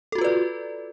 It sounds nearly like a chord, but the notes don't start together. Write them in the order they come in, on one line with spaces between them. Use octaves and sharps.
A4 F#4 F4 B4 D5